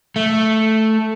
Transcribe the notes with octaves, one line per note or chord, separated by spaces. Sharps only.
A3